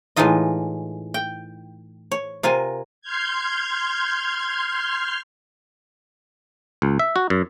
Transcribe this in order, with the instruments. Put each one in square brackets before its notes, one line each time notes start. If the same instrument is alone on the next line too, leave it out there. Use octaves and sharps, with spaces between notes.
[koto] A2 E3 G#3 D#4 F4 D#5
G5
C#5
C3 F4 A#4 G#5
[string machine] C6 F6 G6 G#6
[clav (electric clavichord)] C#2
E5
F#4
F#2